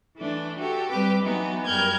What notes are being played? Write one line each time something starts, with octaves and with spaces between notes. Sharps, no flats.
E3 A3 D4
F#4 G4 A4
G3 C4 G4 B4 D6
E3 F#3 B3 D#4
F#2 G3 A#4 F6 G6 G#6